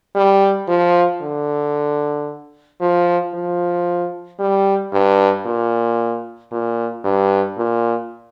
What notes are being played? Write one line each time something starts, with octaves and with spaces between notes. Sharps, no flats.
G3
F3
D3
F3
F3
G3
G2
A#2
A#2
G2
A#2